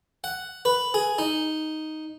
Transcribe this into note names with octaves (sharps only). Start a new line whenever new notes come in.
F#5
B4
G#4
D#4